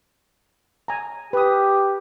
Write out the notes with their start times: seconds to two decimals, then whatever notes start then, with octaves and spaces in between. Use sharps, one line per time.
0.88 G#5 A#5
1.33 G4 B4 D#6